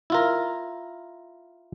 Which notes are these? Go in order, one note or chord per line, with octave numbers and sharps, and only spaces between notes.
E4 F4 A#4